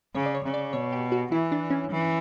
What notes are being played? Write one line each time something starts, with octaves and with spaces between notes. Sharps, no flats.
C#3 C#5
D5
C#5
C#3
D5
B2 C#5
G4
F#4
E3 E4
D4
C#4
E3